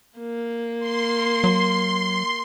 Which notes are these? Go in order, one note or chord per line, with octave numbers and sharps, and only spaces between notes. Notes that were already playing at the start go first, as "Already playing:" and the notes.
A#3
C6
F#3